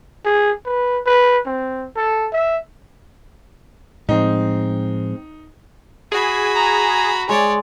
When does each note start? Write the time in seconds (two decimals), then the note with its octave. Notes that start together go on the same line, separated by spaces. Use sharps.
0.25 G#4
0.66 B4
1.06 B4
1.46 C4
1.97 A4
2.33 E5
4.09 A2 F3 G#3 C4 D#4
6.12 F#4 G#4 B5
6.56 A#5
7.29 G#3 C#5 D5